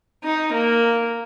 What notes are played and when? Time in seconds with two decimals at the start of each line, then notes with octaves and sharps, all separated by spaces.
0.24 D#4
0.53 A#3